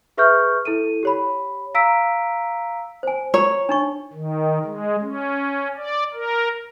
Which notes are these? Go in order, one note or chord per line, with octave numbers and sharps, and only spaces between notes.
G#4 B4 E5 C#6 F6 G6
E4 A4 D#7
G4 C#5 B5
F5 A#5 E6 B6 D7
C5 G#5
C#5 A#5
D4 D#4 C#6
D#3
G#3
C#4
D5
A#4